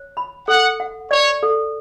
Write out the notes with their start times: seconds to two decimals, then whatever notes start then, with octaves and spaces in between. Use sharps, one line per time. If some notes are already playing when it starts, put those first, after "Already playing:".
Already playing: C#5
0.17 B5
0.48 A4 F#5
0.80 F#5
1.11 C#5 D5
1.43 A4